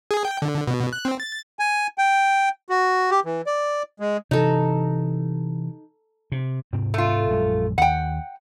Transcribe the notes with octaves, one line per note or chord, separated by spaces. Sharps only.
G#4
G5
D3
B2
F#6
C4
A6
G#5
G5
F#4
G4
E3
D5
G#3
C3 E3 D#4 A4
C3
G#2 C3 C4
A3 F4
A#1 F#2 G#3
D#2 F#5 G5